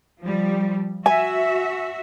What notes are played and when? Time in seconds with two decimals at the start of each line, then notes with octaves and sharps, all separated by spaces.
0.20 F3 G3
1.06 F#4 E5 G#5